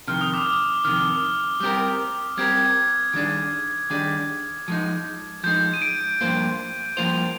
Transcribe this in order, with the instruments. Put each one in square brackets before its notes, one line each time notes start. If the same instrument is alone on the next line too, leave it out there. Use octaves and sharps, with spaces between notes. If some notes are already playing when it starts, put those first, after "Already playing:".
[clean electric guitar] F2 C3 D#3 [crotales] F6
[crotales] D#6
D6
D#6
[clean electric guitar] F2 C3 D#3 [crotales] F6
[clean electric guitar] G3 C4 G4 A#4
[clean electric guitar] G3 C4 G4 A#4 [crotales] G#6
[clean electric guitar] D#3 G3 D4 G#4 D5
D#3 G3 D4 G#4 D5
F3 G#3 D#4
[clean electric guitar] F3 G#3 D#4 [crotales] G6
[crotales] D#7
D7
[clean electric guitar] G2 F3 A#3 F4 C5
[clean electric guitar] G2 F3 A#3 F4 C5 [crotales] F7